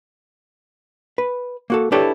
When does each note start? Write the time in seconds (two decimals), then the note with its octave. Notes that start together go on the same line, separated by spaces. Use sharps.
1.18 B4
1.70 A#3 F#4 A4
1.92 D4 E4 G4 A4 B4 C#5